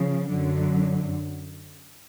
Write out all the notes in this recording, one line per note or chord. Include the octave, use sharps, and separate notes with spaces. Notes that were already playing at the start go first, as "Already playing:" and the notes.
Already playing: C#3 F3
F#2 D3 F#3